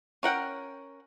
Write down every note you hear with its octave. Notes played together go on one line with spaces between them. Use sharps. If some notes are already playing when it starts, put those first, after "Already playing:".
C#4 A#4 F#5 G5